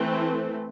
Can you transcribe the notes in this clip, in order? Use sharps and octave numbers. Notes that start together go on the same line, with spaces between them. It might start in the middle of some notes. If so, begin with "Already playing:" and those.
Already playing: E3 A3 C4